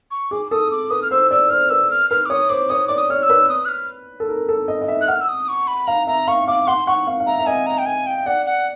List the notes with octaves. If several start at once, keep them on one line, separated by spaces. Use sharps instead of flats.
C#6
G#4 D6
A4 D#6
D6
B4 D#6
F6
C5 E6
D5 E6
C5 F6
B4 E6
F6
B4 F6
D6
C#5 D#6
C5 D6
C#5 D#6
D5 D6
D#6
C#5 F6
E6
B4
D#6
F#6
F6
A4
A#4
A4
D#5
D#5
E5
F#6
F#5 F6
E6
D#6
C#6
B5
F5 A#5
E5 A#5
F5 C#6
F5 D6
F#5 C6
F#5 C#6
F5
F5
E5 A#5
E5
D#5 G#5
A#5
G5
G#5
G5
D5 F#5
F#5